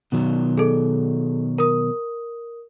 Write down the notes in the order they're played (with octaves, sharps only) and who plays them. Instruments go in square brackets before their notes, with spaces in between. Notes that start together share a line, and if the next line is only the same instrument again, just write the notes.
[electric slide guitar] B2 D#3 F#3
[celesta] G#4 A4
A#4 D#6